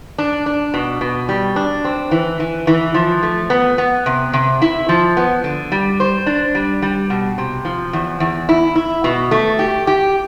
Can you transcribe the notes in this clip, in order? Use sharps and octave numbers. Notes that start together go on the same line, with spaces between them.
D4
D4
B2
B2
G3
D4
C4
E3
E3
E3
F3
A3
B3
B3
C3
C3
E4
F3
B3
D3
G3
C5
D4
G3
G3
B2
C3
F3
E2
E2
E4
E4
B2
A3
G4
G4